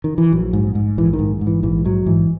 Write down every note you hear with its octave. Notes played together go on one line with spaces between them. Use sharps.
D#3
E3
A#1 F#3
G#2
G#2
A#1 E3
D#3
G#2
G#2
E3
A#1 E3
G#2 F#3
G#2 E3